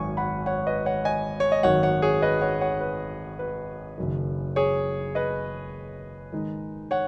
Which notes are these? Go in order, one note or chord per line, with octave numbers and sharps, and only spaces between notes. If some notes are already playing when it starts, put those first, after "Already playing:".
Already playing: G#1 F#2 D#3 G#5 C#6
F#5 B5
C#5 F#5
B4 D#5
C#5 F#5
D#5 G#5
C#5
D#5
G#1 F#2 D#3 F#3 C#5 F#5
C#5 F#5
G#4 C#5
B4 D#5
C#5 F#5
C#5 F#5
B4
B4
F#1 F#2 D#3
G#4 C#5
B4 D#5
G#2 D#3 G#3 D#4
C#5 F#5